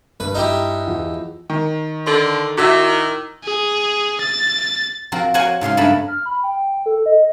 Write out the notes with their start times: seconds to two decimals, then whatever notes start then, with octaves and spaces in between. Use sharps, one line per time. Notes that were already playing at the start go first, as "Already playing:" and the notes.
0.20 G2 B4
0.35 D#4 E4 G4
0.87 E2 E3 F3
1.50 D#3
2.07 D3 A4 C6
2.57 D#3 E4 F#4 D6 E6
3.43 G#4
4.20 A6
5.12 F3 C4 F#4 A#4
5.34 F#4 A#4 C5 C#5 F#5 G#5
5.61 G#2 C#3 F5 C6
5.77 G2 A3 B3 A#4 A5 B5
6.08 F6
6.26 B5
6.43 G5
6.86 A4
7.06 D#5